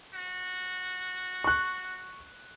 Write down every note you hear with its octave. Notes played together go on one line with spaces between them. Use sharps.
F#4
C#6 F#6